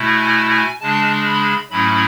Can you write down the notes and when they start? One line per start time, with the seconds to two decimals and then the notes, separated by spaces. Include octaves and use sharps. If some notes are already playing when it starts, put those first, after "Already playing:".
Already playing: B2 A3 E4
0.21 G#5
0.51 G#5
0.81 C#3 G#3 D4 A5
1.26 B5
1.71 G#2 F#3 A3 C#4 E4 B5